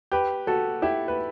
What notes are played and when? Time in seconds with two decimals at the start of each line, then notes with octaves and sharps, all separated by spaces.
0.12 G4 B4
0.47 F#4 A4
0.82 E4 G4
1.08 B4